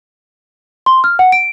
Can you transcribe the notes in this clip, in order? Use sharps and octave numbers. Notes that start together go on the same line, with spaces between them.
C6
F6
F#5
D7